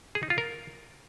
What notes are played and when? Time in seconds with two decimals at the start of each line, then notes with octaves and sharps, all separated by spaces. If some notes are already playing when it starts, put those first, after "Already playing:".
0.15 G#4
0.23 D#4
0.30 F4
0.38 A#4